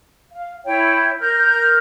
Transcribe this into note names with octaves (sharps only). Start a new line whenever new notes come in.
F5
E4 C#5 G5
A#4 F6 G6